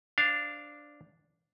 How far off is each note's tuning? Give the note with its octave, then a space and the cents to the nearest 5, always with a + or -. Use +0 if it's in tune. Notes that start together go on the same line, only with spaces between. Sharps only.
D4 +0 C5 +10 F5 +0